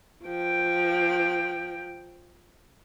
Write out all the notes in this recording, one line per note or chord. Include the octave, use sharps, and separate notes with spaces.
F3 G5